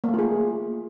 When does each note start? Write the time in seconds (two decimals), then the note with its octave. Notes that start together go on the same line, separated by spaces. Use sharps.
0.04 A#3
0.09 A3
0.14 F4
0.19 G#4